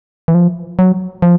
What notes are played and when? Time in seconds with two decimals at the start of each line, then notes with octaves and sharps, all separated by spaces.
0.28 E3
0.34 F3
0.79 F#3
1.22 F3